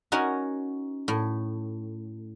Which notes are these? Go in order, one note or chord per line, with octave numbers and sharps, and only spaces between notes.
C#4 D#4 F#4 A#4 C#5
A2